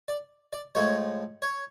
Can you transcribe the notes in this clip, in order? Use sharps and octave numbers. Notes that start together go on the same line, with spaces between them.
D5
D5
A2 F3 G#3 C#5
C#5